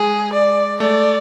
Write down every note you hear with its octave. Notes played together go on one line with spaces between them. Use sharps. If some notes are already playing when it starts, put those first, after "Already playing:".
Already playing: G#3 G#4
D5
A3 D5